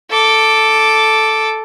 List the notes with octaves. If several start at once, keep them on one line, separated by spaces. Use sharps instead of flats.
A4 D6